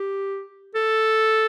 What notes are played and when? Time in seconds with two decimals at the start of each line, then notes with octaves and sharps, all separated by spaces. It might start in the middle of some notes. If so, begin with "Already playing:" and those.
Already playing: G4
0.75 A4